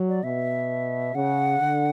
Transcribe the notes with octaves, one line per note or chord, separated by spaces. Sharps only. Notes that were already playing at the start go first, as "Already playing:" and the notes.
Already playing: F#3
D5
B2 E5
C#3 F#5
D3